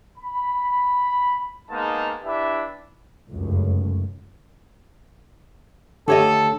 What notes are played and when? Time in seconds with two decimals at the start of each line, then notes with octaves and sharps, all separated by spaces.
0.18 B5
1.70 G#3 A#3 B3 D#4 F5 A5
2.23 D4 E4 G4 B4 E5
3.30 F1 C#2 F#2
6.08 D3 A3 G4 A4 C#5 D#5